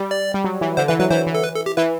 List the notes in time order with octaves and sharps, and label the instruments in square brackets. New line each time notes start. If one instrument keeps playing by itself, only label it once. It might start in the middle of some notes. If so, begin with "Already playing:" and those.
Already playing: [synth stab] G3
[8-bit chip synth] D5
[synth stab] G3
F#3
E3
[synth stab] D3 [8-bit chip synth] C5
[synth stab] E3 [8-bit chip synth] B4
[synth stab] F#3 [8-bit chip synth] B4
[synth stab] E3 [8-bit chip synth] C5
[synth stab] E3
[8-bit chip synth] A4
B4
A4
G4
[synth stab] E3 [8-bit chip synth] B4